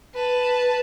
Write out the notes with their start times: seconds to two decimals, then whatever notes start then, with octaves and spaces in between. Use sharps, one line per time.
0.15 B4 A5